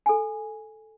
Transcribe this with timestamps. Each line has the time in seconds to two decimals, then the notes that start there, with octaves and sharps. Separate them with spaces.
0.06 A4 G#5